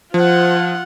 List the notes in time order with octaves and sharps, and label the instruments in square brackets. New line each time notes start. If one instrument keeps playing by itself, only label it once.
[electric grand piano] F3 [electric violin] F4 F#5 [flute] C5